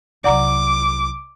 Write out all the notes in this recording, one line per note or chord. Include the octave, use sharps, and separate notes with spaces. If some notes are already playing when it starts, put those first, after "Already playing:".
C2 F#3 D5 F#5 A#5 D6